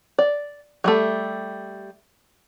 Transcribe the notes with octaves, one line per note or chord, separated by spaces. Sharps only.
D5
F#3 G3 A3